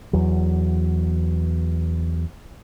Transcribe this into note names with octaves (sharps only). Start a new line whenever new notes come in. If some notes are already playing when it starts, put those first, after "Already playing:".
E2 F#3